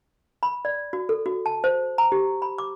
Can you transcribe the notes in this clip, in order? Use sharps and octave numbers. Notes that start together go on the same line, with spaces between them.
B5
D5
F#4
A4
F#4
A5
C5
A#5
G4
B5
D6